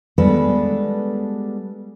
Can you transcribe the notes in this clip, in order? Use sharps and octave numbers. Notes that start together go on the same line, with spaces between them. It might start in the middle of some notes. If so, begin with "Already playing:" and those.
G3 G#3 B3 D4 A4 B4